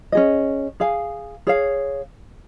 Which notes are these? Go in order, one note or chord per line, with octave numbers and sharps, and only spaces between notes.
C#4 G#4 D#5
G#4 F5 G#5
G#4 C#5 F5